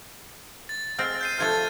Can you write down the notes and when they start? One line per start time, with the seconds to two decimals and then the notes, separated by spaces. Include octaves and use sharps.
0.69 A6
0.99 G#3 C4 C5 F6
1.21 G6 C7 D#7
1.38 C3 F3 A3 F6 G#6 A6